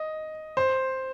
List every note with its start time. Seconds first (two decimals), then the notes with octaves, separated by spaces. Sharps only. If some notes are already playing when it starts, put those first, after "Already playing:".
Already playing: D#5
0.57 C5